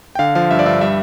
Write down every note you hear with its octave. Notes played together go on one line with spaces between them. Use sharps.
G5
D3 F5
F3 F5
G2 E5
D5
G2 E5
G3 E5